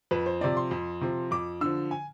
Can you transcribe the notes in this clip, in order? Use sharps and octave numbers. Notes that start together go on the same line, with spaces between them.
F2 B4
C5
C3 F3 D5
C6
F2
C3 F3
F2 D6
D3 F3 E6
G#5